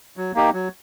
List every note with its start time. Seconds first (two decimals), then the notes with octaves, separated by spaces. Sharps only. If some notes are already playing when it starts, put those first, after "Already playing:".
0.17 F#3
0.34 A#3 D#4 G4
0.53 F#3